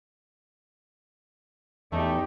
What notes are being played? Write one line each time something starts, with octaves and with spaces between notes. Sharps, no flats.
E2 A3 D#4 G4